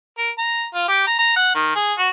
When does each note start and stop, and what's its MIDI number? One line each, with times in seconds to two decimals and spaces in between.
0.18 0.30 70
0.38 0.66 82
0.74 0.87 65
0.88 1.05 67
1.07 1.15 82
1.19 1.34 82
1.36 1.52 78
1.55 1.74 51
1.75 1.93 68
1.98 2.09 66